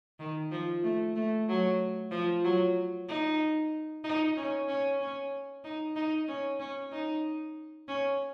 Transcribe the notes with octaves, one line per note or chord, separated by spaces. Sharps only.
D#3
F3
A3
A3
F#3
F3
F#3
D#4
D#4
C#4
C#4
C#4
D#4
D#4
C#4
C#4
D#4
C#4